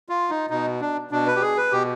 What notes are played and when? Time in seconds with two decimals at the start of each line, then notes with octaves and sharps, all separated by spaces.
0.09 F4
0.30 D#4
0.50 B2 D#4
0.81 D4
1.11 B2 D4
1.27 B4
1.35 G4
1.42 G#4
1.57 B4
1.72 B2 G4